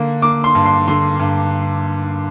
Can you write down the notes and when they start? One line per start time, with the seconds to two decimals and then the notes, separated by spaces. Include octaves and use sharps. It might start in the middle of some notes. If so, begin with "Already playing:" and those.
Already playing: D3 A#3
0.22 A#3 D6
0.44 C6
0.55 G2
0.65 C6
0.88 D3 C6
1.19 G2